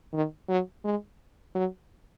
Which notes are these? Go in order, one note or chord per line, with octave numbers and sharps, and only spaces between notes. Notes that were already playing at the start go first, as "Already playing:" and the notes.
D#3
F#3
G#3
F#3